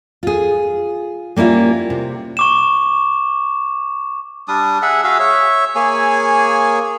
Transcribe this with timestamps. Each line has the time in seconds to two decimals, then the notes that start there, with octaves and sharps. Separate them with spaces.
0.23 F4 G#4
1.36 G3 A#3 C#4 E4 F4
1.90 C3
2.37 C#6 D6 E7
4.48 G3 D4 D#6
4.82 G#4 E5 F#5
5.04 F#4 G#4 E5 F5
5.19 C#5 E5
5.75 A#3 G#4 C#5 G#5